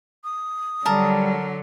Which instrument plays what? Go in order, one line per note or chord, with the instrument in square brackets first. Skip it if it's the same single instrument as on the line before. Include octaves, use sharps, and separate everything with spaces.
[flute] D#6
[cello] D3 F#3 [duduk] G3 [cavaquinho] A#4 A5